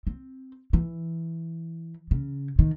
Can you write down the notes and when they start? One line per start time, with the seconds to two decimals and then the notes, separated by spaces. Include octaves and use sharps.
0.07 C4
0.73 E3
2.11 C#3
2.59 D#3